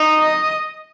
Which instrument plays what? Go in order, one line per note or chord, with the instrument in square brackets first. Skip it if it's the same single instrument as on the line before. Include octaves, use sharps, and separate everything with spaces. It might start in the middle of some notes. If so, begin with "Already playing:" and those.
Already playing: [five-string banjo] D#4
[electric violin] D#5